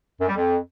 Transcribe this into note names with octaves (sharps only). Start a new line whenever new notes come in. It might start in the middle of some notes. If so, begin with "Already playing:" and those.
F#2
G3
F2